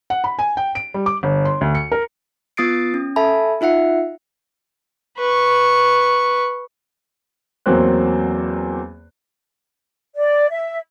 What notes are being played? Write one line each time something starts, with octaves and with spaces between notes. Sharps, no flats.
F#5
B5
G#5
G5
D7
G3
D6
G1
C6
D2
C#7
A#4
B3 F4 D#6 A6 C7 D7
C#4
A4 E5 G#5 A5 B5
D#4 F4 E5 F#5 C#7
B4 C#6
E2 F#3 A#3 C4 C5 F#6
D5
E5